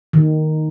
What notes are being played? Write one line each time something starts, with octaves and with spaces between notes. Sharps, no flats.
D#3